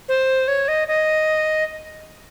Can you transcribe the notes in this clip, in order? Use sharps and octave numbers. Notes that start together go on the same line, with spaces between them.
C5
C#5
D#5
D#5